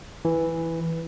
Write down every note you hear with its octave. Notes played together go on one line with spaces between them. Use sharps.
E3